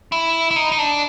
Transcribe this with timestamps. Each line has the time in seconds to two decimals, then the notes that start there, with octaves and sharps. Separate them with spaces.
0.12 E4
0.51 E4
0.56 D#4
0.72 D#4
0.78 D4